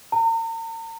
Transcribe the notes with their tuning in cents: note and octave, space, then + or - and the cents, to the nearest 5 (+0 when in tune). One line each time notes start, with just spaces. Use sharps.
A#5 -40